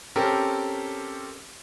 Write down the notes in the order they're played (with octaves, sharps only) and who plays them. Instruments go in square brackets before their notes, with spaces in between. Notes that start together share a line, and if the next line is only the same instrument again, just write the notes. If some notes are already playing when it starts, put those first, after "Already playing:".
[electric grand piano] C4 C#4 G4 A4 A#4